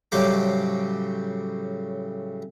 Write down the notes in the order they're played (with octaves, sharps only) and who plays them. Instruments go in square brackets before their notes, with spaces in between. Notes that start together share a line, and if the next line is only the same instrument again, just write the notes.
[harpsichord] A2 C#3 F#3 G3 C5 D6